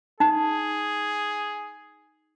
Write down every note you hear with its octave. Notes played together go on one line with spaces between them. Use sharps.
D#4 G#4